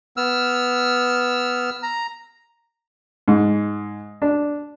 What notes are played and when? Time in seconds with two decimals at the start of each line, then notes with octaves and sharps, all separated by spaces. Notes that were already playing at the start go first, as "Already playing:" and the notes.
0.17 B3 E6 F6
1.83 A#5
3.28 G#2
4.22 D4